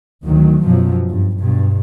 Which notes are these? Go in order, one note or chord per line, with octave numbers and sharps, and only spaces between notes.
D2 D#3 F#3
F#2 B2 F3 F#3
G2
G2 B2